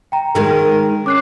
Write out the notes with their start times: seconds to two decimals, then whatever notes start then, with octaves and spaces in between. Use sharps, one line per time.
0.12 G5 A#5
0.35 D#3 G#3 A#4
1.06 C#4 D6 F#6 C7